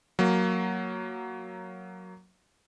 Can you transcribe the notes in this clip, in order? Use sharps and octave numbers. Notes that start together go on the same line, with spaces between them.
F#3 A#3